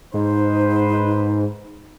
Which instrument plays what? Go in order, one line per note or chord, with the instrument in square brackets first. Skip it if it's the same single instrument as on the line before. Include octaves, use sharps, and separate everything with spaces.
[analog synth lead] G#2 [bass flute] D#4 [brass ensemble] B4 C5